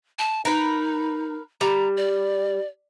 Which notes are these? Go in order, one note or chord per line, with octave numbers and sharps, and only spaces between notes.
A5
D#4 A#4 B4
G3 A#5
D5